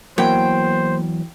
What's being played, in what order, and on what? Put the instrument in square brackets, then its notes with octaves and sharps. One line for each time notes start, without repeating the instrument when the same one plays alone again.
[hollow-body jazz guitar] E2 E3 F#3 [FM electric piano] A#3 [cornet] C5 [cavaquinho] G5